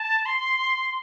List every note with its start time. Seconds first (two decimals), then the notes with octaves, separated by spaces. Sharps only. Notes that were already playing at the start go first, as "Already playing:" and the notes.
Already playing: A5
0.25 C6